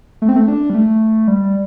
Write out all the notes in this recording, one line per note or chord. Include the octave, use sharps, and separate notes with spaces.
A3
C4
A3
D4
G3
A3
G3